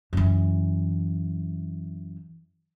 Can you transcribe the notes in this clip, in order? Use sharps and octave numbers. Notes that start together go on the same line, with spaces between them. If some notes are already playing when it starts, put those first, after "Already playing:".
F#2 E3